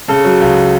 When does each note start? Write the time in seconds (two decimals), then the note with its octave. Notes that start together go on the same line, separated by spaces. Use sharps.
0.08 C#3 A4
0.25 F#3
0.41 C#2